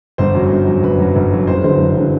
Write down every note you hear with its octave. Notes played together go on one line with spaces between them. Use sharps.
G1 C5
F#2 F#3
G1
F#2 F#3
G1 B4
F#2 F#3
G1
F#2 F#3
F#1 C5
B4
F#2 D3 F#3 C5
F#1
D3 F#3